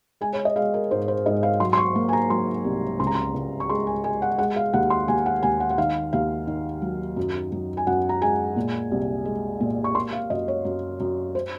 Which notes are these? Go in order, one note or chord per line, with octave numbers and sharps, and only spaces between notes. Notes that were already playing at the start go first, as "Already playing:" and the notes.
G#3 G#5
C#5
D#5
G#3 F5
A#4
G#2 C5
C5
G#2 D#5
F5
F#3 C6
C6
C#6
A#3
G#5
A#5
F#3 C6
C2
C#2 C6
A#5
C6
C#2
C#6
G#3 C6
G#5
G#3 G#5
F#5
G#3 F#5
F5
D#2 F#5
C6
D#2 G#5
F#5
D#2 G#5
F#5
F#5
D#3 F5
D#2 F5
D#3
F#3
F#2
F#2
G#5
F#2 F#5
A#5
G#3 G#5
A#2
C2
G#3
A#2
C#6
A#3 C6
F5
F#2 D#5
C#5
F#2
F#2
C5